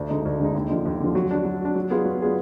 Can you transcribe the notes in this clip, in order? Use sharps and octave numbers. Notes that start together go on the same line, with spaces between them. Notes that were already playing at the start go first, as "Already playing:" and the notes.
Already playing: D2
D3 G#3 D#4
D2
D3 G#3 D#4
D#2
D3 F3
D#2
D3 F3
F#3
D4 F#4
F#3
D4 F#4
F#3
B3 F4 G#4 B4
F#3
B3 F4 G#4 B4